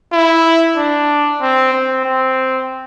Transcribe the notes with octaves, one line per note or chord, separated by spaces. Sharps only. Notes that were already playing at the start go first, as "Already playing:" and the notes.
E4
D4
C4
C4
C4